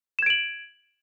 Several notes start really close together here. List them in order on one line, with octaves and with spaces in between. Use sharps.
E7 G#6 D7 F#7